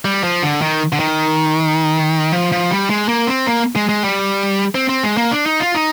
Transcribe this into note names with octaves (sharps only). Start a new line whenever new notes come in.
G3
F3
D3
D#3
D3
D#3
F3
F3
G3
G#3
A#3
C4
A#3
G#3
G#3
G3
C4
C4
G#3
A#3
D4
D#4
F4
D#4